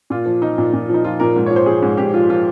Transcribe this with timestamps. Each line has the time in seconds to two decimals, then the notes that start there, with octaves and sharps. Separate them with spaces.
0.10 A#2 F4
0.26 F3
0.42 F3 D#4
0.58 A#2
0.74 A#2
0.89 F3 D#4
1.04 F3 F4
1.20 A#2 A#4
1.36 G#2
1.46 C#5
1.51 F3
1.56 C5
1.66 F3 G#4
1.82 G#2
1.98 G#2 G4
2.14 F3 F4
2.29 F3 F4